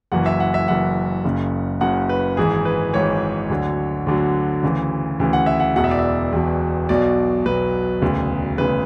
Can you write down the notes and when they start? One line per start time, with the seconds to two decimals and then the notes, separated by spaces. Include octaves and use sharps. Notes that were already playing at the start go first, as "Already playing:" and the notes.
0.12 F#1 F#2 E3 F#5
0.26 E5
0.40 F#5
0.54 E5
0.68 F#1 F#2 E3 F#5
1.25 F#1 F#2 C#3
1.81 F#1 F#2 C#3 F#5
2.09 B4
2.37 G#1 G#2 E3 G#4
2.65 B4
2.93 G#1 G#2 E3 C#5
3.50 D2 D3 F#3
4.07 D2 D3 F#3
4.63 D2 C#3 E3
5.20 D2 C#3 E3
5.33 F#5
5.46 E5
5.60 F#5
5.76 E1 E2 B2 F#5
5.84 E5
5.91 D5
5.99 E5
6.33 E1 E2 B2
6.89 B1 B2 F#3 D5
7.45 B1 B2 F#3 B4
8.02 E1 D2 C#3
8.58 E1 D2 C#3 B4